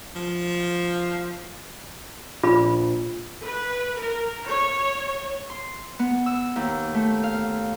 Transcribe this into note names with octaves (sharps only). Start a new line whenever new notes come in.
F3
A#1 F4 B5
B4
A#4
C#5
C6
B3
E6
D#2
A3
F5